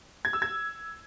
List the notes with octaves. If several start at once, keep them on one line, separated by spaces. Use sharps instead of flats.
G#6
E6
G#6